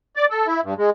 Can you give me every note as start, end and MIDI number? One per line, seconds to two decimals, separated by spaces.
0.16 0.26 74
0.30 0.47 69
0.47 0.61 64
0.64 0.74 43
0.78 0.90 56